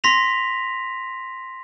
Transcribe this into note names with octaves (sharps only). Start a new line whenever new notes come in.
C6 A#6 B6 F7